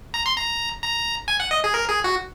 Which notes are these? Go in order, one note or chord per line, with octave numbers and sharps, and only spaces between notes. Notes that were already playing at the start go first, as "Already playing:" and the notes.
A#5
C6
A#5
A#5
G#5
F#5
D#5
G#4
A#4
G#4
F#4